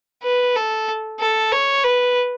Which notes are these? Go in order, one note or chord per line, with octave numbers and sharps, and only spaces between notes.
B4
A4
A4
C#5
B4